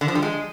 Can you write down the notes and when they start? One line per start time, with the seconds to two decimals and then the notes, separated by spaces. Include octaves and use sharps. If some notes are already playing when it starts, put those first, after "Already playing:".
0.01 D3
0.08 F3
0.15 G3
0.22 G#3